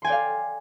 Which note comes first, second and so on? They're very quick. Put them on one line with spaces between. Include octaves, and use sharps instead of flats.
C6 G#5 G5 D5 F5